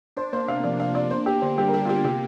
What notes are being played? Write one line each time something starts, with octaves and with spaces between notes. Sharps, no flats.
D4 C5
A#3 C5
C3 F5
F3 D5
D4 F5
A#3 D5
D4 C5
A#3 G4
D3 C5
G3 G4
A#4
D4 G4
F4
A#3 G4
C3 G4